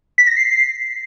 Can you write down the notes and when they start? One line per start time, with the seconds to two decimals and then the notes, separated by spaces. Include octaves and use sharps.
0.18 B6
0.27 A#6
0.36 C7